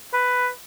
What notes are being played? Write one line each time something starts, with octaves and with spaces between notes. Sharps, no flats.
B4